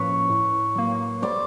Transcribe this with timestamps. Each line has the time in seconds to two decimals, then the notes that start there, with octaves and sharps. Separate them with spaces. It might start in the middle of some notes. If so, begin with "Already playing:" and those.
Already playing: A2 F3 A#3 C#4 B4 C#5
0.30 A2
0.76 F#3 A#3
1.22 G3 C5 D5